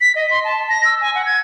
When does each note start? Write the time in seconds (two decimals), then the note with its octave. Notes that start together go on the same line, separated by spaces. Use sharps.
0.01 B6
0.16 D#5
0.31 C6
0.44 A5
0.69 A#6
0.85 E6
1.01 G#5
1.15 F#5
1.26 G#6